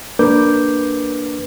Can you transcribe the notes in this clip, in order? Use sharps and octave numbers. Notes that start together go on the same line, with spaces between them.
A#3 D4 A#4 B4 D6 G6